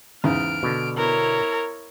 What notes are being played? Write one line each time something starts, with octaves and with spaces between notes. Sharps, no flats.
E2 G#2 C#3 F6 D7
B2 D3
B3 E4 A#4 C#5